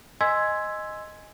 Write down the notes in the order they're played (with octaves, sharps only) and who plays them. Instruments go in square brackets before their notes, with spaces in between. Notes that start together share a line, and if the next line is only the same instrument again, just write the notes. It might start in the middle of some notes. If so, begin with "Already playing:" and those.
[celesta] D#5 G#5 C6 E6 G#6 B6